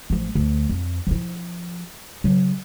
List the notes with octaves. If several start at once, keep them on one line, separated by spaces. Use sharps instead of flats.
A1 F3
D2
F2
F3 E4
C#3 F#3